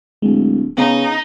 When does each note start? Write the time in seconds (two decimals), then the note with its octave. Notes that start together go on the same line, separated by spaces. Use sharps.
0.22 D1 G#3
0.78 C#3 B3 D#4